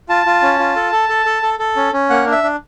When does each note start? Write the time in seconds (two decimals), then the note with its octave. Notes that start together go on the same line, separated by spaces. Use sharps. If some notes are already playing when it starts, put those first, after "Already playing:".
0.09 F4 A5
0.26 F4
0.42 C#4
0.59 F4
0.76 A4
0.92 A4
1.09 A4
1.26 A4
1.43 A4
1.59 A4
1.76 C#4
1.93 C#4
2.10 A#3 F#5
2.26 D4
2.32 E5
2.43 D4